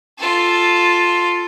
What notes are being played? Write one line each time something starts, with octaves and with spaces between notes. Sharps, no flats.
F4 A4